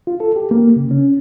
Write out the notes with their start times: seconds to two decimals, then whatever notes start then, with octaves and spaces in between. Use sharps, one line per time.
0.07 F4
0.20 A4
0.36 G4
0.51 A#3
0.76 C#3
0.91 C#4